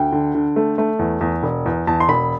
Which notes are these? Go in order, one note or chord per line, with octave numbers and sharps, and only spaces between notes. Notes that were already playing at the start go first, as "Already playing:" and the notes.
Already playing: D2 G5
D3
D3
A3
A3
E2
E2
E1
E2
E2 A5
C6
E1 B5